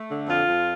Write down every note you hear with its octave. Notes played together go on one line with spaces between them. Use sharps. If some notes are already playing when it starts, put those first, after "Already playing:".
Already playing: A3
D3
F2 F4
F2